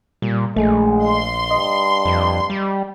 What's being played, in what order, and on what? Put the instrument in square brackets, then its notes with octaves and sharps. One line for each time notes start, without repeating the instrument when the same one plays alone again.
[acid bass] A#2 [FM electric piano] G3
[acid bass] A#1 [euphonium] G#3 [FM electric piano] A3
[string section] C6
[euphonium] G2 [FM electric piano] D#5
[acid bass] F2
G3